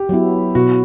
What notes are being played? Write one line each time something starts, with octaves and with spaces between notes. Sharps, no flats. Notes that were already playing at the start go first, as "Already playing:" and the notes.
Already playing: G4
F#3 B3 E4
B2 F#4